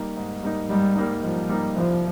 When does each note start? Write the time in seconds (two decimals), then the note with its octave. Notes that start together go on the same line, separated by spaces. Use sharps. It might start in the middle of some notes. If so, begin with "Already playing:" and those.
Already playing: G3 A#3 D#4
0.16 G#2
0.43 G3 A#3 D#4
0.70 G#2 G3
0.96 G3 A#3 D#4
1.22 G#2 F3
1.49 G3 A#3 D#4
1.76 C2 F3